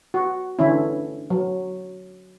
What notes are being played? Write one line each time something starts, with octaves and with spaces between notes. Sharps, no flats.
F#4
D3 E3 C#4 E4
F#3